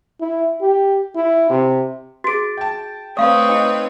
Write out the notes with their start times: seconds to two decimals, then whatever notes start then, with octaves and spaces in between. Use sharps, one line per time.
0.21 E4
0.62 G4
1.15 E4
1.50 C3
2.24 F#4 G#4 A6 D7
2.57 G5 A5
3.17 A3 C4 B4 C#5 D5 F5 C#6 D#6
3.49 D#4 G5